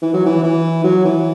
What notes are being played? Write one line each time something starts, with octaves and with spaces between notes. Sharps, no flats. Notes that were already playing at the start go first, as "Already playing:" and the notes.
E3
F#3
E3
E3
F#3
E3